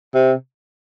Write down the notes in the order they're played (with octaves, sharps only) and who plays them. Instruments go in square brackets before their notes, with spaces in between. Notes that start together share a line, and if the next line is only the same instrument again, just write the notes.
[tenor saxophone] C3